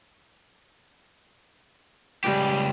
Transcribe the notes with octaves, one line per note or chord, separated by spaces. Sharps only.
C#2 G3 G4